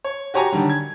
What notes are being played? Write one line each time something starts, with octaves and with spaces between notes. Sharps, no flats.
C#5
F#4 G4 C#5 G#5 A#5 C#6
D3 D#3 G3
G#6